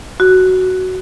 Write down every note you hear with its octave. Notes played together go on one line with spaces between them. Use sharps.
F#4